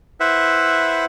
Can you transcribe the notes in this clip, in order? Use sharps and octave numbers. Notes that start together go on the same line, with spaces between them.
E4 B4 C5 E5 F#5